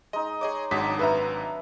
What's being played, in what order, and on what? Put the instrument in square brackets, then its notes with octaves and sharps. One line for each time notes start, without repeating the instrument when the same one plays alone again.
[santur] G#3 D#4 [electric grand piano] D#5
[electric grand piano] G#4 D#5 D6 [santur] C#5
[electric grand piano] G#1 G#2 [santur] F#3 D4 D#5 [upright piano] B6
[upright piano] B4 E5 A#5